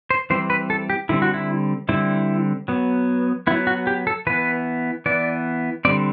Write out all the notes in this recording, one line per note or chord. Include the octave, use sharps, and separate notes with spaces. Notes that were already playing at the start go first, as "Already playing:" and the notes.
C5
E3 G3 C4 C5
B4
A4
G4
D3 G3 C4 E4
F#4
E4
D3 G3 C4 E4
F#3 B3
F#3 B3 E4
F#4
G4
A4
E3 B3 B4
E3 B3 D5
D3 G3 C4 D5